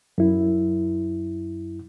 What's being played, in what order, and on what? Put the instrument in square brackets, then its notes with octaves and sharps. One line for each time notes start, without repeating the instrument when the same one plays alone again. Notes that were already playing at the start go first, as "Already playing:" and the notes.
[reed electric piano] F#2 E4